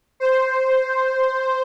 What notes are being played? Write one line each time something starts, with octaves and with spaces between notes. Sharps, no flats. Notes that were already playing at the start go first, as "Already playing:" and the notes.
C5